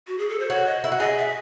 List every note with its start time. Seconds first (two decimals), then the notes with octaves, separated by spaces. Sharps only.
0.07 F#4
0.18 G#4
0.29 A4
0.40 C5
0.50 F#4 C#5
0.66 D#5
0.84 E4
0.92 F#4
1.00 G#4 D#5
1.17 E5